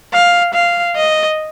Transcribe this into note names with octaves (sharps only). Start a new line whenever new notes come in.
F5
F5
D#5